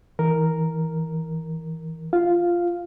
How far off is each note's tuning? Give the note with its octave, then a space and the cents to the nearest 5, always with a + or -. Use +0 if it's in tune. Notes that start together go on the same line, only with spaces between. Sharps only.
E3 -20 A#4 +0
F4 -10 F5 +0